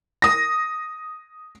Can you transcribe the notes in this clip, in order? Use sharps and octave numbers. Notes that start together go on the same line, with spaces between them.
D#6 A#6